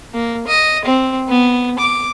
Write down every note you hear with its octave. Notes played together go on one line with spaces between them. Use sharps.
A#3
D#5
C4
B3
D6